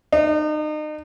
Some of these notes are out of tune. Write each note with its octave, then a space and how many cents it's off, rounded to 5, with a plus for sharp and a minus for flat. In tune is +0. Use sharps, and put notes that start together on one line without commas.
D#4 -35